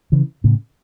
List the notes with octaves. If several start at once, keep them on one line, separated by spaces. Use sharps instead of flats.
C#3 E3
A2 C#3